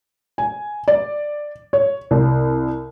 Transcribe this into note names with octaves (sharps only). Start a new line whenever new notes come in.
G#5
D5
C#5
C2